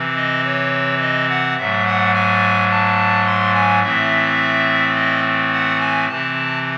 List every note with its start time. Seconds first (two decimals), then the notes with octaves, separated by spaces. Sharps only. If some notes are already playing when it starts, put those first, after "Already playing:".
Already playing: C3 E3 C4
0.16 D#5
0.44 C#5
1.01 D#5
1.29 F#5
1.57 G#2 F#3 A3 E5
1.86 F#5
2.14 G#5
2.70 A5
3.26 C6
3.54 G#5
3.83 A2 E3 A3 C4 E5
4.96 D#5
5.52 F#5
5.80 G#5
6.08 C3 E3 C4 A5